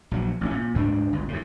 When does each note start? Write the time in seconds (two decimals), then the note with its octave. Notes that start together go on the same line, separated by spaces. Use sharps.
0.11 A#1 F#3
0.41 A1 B3 C#4
0.54 A#2
0.74 D2 G#2 G#3 D4
1.12 G1 C#2
1.28 D#2 A2